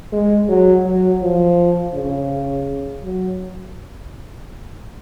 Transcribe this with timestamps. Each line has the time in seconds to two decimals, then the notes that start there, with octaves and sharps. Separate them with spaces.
0.13 G#3
0.49 F#3
0.86 F#3
1.22 F3
1.94 C#3
3.04 F#3